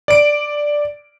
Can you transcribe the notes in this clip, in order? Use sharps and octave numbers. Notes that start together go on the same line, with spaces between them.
D5 D7